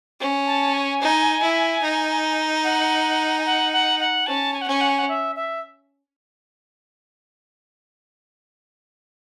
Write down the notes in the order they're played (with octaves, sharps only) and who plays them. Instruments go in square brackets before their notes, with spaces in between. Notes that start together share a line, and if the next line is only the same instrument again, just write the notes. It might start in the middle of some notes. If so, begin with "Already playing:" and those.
[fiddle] C#4
[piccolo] A5
G#5
[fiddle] D#4
E4
D#4
[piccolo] F#5
G#5
F#5
F#5
F#5
[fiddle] C#4 [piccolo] A5
[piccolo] G#5
F#5
[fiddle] C#4 [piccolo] G#5
[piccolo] F#5
G#5
F#5
E5
E5